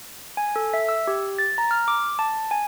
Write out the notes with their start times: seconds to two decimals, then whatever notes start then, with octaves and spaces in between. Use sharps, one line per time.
0.37 G#5
0.56 A4
0.73 E5
0.89 E6
1.07 G4
1.39 A6
1.58 A#5
1.71 F6
1.88 D6
2.19 A5
2.51 G#5